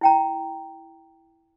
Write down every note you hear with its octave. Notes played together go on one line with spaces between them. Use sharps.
E4 G5 A#5